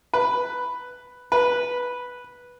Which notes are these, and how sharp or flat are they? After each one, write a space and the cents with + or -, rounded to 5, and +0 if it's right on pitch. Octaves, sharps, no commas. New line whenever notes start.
B4 +5
B4 -5